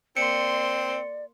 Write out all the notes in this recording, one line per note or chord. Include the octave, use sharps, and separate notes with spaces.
A#3 C4 D5 C6 C#7